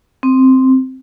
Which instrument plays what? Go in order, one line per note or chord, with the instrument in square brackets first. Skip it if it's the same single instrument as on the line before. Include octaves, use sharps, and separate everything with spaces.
[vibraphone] C4